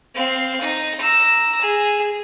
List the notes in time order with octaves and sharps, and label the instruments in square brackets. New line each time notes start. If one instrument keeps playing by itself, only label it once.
[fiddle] C4 F5
D#4
A#5 E6
G#4